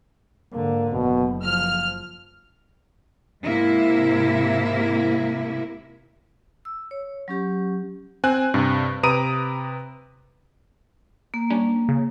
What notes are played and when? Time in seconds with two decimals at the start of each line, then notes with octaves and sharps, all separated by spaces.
0.54 G#2 D3 A#3
0.92 F#1 B2
1.44 F3 F6
3.43 G#2 C3 A#3 E4
6.65 E6
6.91 C#5
7.28 F#3 C#4 G4
8.24 C4 G#5 F#6
8.54 G2 C3
9.03 C3 B4 A#5 D#6 D7 D#7
11.34 A#3
11.50 G3 C#4 D4
11.89 C#3